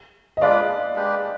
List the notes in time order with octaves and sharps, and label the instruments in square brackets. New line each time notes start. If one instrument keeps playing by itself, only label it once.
[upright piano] D#5
[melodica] G#3 D4 F4 B4 [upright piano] D5 F5
[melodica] G#3 D4 G4 B4